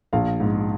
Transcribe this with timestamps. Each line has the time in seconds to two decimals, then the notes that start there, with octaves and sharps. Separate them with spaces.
0.13 A#1 F5
0.40 G#2